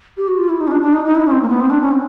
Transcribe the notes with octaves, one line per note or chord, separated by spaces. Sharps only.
G4
F#4
F4
E4
D#4
C#4
D4
D4
D#4
D#4
E4
C#4
C4
A#3
B3
C4
D4
C#4
C4